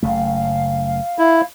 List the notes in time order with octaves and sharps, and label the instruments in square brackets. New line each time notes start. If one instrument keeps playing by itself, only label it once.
[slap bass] F#1 C#3 A3 [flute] F5
[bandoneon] E4